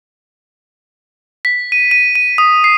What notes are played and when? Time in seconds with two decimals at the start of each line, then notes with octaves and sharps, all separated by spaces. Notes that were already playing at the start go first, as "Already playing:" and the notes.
1.45 B6
1.72 D#7
1.91 D#7
2.15 D#7
2.38 D#6
2.64 C7